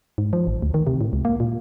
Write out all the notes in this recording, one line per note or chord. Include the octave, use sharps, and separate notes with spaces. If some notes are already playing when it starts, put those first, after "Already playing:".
G#2
F3
A1
D2
D#3
C3
A2
C#2
A#3
A#2